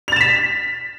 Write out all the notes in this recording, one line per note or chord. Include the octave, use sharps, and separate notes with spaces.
A6 B6 E7 F7